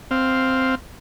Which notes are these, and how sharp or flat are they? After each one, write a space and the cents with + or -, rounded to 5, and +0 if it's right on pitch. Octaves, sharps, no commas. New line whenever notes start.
C4 +0 F5 +0